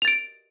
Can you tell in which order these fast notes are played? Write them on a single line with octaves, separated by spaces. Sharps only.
F7 A6 D7